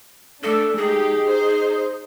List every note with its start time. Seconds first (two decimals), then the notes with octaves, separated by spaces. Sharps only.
0.43 A3 D4 A4
0.77 G#3 D#4 G4 G#4
1.25 D#4 C5